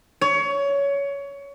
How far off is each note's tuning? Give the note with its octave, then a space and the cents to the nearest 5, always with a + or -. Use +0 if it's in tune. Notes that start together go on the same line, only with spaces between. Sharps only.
C#5 +20